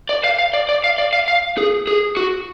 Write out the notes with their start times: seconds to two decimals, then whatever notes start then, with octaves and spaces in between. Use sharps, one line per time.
0.09 D5
0.24 F5
0.39 F5
0.53 D5
0.69 D5
0.84 F5
0.98 D5
1.13 F5
1.28 F5
1.58 G#4
1.87 G#4
2.17 F#4